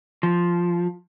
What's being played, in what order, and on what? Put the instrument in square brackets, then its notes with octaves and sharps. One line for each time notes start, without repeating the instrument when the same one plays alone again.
[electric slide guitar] F3